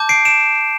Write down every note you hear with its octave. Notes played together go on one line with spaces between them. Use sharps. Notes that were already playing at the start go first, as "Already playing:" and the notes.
Already playing: A5 D6 G6
C7 D7
D7 E7